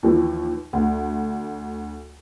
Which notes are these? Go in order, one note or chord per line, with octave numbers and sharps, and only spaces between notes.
D#2 E3 F3
D2